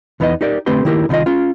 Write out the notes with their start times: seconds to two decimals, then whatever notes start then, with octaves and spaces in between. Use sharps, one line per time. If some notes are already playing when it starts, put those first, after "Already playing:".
0.20 E2 E3 B3 D#4 D#5
0.41 D#4 G4 A#4 D5
0.66 D3 A3 C4 G4 B4 C6
0.85 D#3 A#3 E4 G4 A#4
1.09 C2 D#3 D4 F4 D#5
1.26 C#4 F4